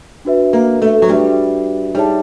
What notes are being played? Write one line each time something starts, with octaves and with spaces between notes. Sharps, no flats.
D4 F#4 B4 E5
A#3
A3
F#3
G3 D4 F#4 B4 E5
G3 D#4 G#4 C#5 E5 A5